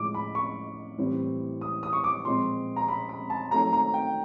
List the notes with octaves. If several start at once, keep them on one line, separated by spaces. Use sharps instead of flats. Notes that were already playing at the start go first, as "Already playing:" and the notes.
Already playing: A2 F3 G#3 D6
B5
C#6
A2 E3 G3 C4
D#6
D#6
C#6
D6
A#2 F3 G#3 C4 C6
A#5
B5
B5
A5
D#3 F#3 A3 C4 A#5
A#5
G5